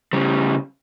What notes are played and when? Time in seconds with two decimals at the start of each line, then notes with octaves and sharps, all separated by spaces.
0.13 C#3 G3